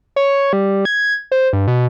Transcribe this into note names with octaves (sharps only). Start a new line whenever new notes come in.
C#5
G3
G#6
C5
G2
B2